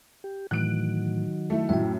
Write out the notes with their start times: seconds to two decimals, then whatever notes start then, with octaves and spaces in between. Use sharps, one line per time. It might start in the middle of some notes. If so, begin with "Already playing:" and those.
0.24 G4
0.51 A2 D#3 E3 F#3 A3 F#6 D7
1.50 A3 E4
1.69 F#2 A2 E4 E5 G5